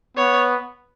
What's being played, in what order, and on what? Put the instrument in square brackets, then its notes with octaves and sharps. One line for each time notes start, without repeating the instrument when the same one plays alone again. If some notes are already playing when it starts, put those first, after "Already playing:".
[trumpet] B3 [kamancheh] C#5